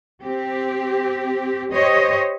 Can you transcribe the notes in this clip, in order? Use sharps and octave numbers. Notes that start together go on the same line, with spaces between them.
C4 G4
G4 C5 C#5 D#5